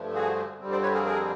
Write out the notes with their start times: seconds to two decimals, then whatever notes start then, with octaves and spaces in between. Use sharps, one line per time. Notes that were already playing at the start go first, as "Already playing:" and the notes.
Already playing: G2 D3 F3 A3
0.14 F#4 G#4
0.59 F2 D3 G3 C4
0.72 C5 D5
0.82 B4 C#5
0.94 G#4 A#4
1.05 G#4 A#4